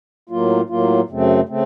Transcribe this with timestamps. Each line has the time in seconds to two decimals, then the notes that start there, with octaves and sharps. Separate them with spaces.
0.30 A2 F#3 A#3 F4
0.69 A2 F#3 A#3 F4
1.09 F#2 C#3 A3 C4
1.49 C#3 A3 C4